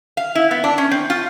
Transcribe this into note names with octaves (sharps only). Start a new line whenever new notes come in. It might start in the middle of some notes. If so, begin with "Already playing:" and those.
F5
E4
B3
D4
C#4
C4
F4